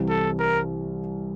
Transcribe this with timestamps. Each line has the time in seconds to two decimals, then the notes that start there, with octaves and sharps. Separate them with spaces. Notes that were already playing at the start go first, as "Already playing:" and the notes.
Already playing: C2 C3 E3
0.09 A4
0.39 A#4